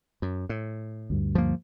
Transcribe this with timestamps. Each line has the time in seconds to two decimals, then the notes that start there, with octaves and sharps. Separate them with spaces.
0.22 F#2
0.49 A2
1.10 D2 G2
1.35 F3 A#3